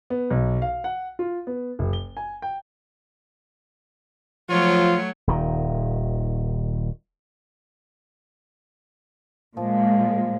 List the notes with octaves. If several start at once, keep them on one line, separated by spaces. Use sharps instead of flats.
B3
B1
F5
F#5
F4
B3
F#1
G7
G#5
G5
F3 F#3 A3 F4 C#5
D#1 D#3
A#2 F3 G#3